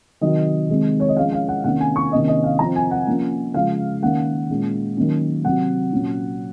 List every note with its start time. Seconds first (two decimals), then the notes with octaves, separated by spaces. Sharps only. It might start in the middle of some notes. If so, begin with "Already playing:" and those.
0.21 C3 D#3 F#3 D#5
0.69 C3 D#3 G#3 C4
1.00 C#5
1.09 D#5
1.17 F3 G#3 C#4 F5
1.33 F5
1.48 F#5
1.64 C3 D#3 A#3 C#4 F#5
1.80 G#5
1.96 C#6
2.12 C3 D#3 A#3 C#4 D#5
2.28 D#5
2.44 F5
2.59 F3 C4 A#5
2.76 G#5
2.91 F#5
3.07 F3 A#3 C#4
3.54 C#3 F3 G#3 F5
4.02 D#3 A#3 C#4 F#5
4.50 A#2 G#3 C#4
4.97 D#3 F#3 A#3 C#4
5.45 C3 F#3 C4 F#5
5.92 A#2 F#3 C#4